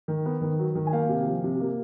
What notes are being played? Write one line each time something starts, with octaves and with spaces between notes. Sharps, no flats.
D#3
B3
D#3
F#3
D#3
G#5
A#3 F5 G5
C3
F3
C3
A#3